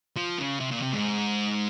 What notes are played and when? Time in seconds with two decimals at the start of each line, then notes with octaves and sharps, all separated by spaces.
0.17 F3
0.39 C#3
0.61 C3
0.72 A#2
0.82 C3
0.93 G#2